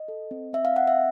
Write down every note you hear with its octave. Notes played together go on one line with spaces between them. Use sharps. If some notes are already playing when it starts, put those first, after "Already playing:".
Already playing: D#5
A4
C4
C4 E5
F5
C4 F#5
E5